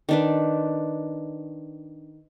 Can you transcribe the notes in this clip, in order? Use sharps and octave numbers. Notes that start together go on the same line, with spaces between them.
D#3 D4 B4